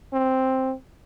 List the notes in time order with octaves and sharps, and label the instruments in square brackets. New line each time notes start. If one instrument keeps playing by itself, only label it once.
[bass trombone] C4